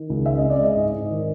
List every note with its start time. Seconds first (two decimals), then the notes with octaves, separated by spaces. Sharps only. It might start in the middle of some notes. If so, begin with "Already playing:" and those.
Already playing: D#3
0.10 C#2
0.25 G#3 E5
0.38 C3 D#5
0.50 D5
0.59 G#3 D#5
0.76 G#2
0.93 G#2
1.11 D#3